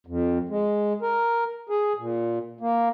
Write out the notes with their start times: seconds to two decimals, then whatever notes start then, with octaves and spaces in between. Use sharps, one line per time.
0.07 F2
0.49 G#3
1.02 A#4
1.69 G#4
1.99 A#2
2.61 A#3